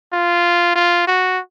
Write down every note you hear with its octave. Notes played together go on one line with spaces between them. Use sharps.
F4
F4
F#4